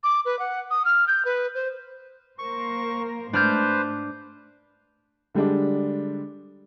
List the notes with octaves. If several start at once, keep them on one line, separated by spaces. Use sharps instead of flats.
D6
B4
F#5
D#6
F6
G6
B4
C5
A#3 A#4 C5 C#6
G#2 A3 D4 B4 C5 F6 G6
D3 G3 G#3 D4